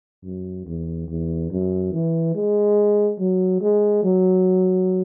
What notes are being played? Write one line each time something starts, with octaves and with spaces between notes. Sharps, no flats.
F#2
E2
E2
F#2
E3
G#3
F#3
G#3
F#3